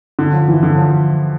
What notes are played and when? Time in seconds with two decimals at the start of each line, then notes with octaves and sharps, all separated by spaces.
0.19 D3
0.33 F3
0.48 E3
0.63 D3
0.78 F3